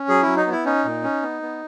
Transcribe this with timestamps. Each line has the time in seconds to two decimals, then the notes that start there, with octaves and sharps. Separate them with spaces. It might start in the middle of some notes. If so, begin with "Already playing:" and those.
Already playing: C#4
0.08 F#3 G#4
0.23 F#3 E4
0.37 D#4
0.46 B3
0.52 E4
0.65 C#4 D#4
0.85 A#2
1.03 C#4
1.22 B3
1.42 B3